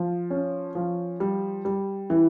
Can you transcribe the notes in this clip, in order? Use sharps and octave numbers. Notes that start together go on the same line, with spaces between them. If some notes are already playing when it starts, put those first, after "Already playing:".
Already playing: F3
C#4
F3
G3
G3
E3